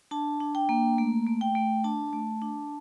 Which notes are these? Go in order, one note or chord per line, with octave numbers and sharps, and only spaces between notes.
D4 A5
D4
G5
A#3
A3
A3
G5
A3
D4 A5
A3
D4